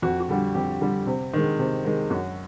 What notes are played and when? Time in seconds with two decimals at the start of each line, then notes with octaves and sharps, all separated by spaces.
0.02 F2 F#4
0.20 F#4
0.29 D3 G3
0.55 F2 G4
0.81 D3 G3
1.07 C3
1.34 D#3 G#3
1.59 C3
1.85 D#3 G#3
2.10 F#2 F#4